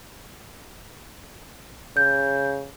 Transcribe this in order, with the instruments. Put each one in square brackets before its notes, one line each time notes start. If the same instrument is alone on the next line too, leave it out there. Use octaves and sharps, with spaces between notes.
[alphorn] C#3 [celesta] G6